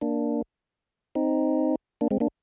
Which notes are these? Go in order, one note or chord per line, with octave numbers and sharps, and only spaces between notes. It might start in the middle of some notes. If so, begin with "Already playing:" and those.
A#3 D4
C4 D#4
A#3 D4
G#3 C4
A#3 D4